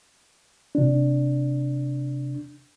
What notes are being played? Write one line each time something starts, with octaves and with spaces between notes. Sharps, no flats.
C3 D4